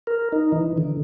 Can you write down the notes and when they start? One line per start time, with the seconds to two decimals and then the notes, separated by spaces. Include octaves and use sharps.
0.07 A#4
0.32 D#4
0.52 E3
0.78 D3